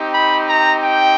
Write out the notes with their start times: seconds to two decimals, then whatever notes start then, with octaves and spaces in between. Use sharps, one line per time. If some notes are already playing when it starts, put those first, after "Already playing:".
Already playing: C4 D#4 G4
0.12 B5
0.48 A#5
0.84 G5